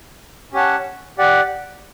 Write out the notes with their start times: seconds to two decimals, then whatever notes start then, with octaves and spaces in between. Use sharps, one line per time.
0.53 C#4 G4 C#5 F#5 A5
1.18 G4 D5 F#5